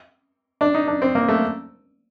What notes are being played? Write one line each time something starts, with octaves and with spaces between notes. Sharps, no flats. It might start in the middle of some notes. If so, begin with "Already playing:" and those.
D4
D#4
D4
C4
A#3
A3